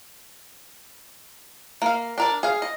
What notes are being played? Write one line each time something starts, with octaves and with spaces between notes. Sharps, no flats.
A#3 F5
D4 A#4 D5
G#4 F5
D#5